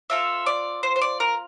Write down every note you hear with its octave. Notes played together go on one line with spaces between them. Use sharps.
C4 F4 A4 E5
D5
C5
C5
D5
A#4